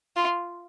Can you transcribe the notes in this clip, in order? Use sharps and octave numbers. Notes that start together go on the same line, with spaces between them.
F4